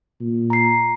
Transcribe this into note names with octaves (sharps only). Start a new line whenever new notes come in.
A#2
A#5 C7